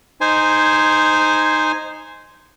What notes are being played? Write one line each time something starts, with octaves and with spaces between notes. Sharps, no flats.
D#4 C5 G#5